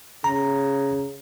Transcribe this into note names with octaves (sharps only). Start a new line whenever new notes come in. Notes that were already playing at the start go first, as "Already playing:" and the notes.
C#3 A#5